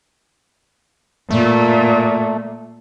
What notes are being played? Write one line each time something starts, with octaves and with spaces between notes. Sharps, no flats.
A#2 A3